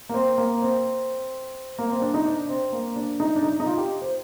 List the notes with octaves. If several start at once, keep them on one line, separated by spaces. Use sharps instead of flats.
A#3
C4
A#3
C4
A#3
C4
D4
D#4
D4
C4
A#3
D4
D#4
D4
D#4
D#4
F4
G4
C5